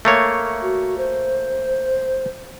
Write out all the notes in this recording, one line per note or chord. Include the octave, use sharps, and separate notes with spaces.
A3 A#3 C#5
F#4
C5